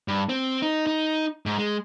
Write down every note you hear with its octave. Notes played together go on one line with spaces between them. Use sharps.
G2
C4
D#4
D#4
G#2
G#3